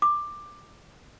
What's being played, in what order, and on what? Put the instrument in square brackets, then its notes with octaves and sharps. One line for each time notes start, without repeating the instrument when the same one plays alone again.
[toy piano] D6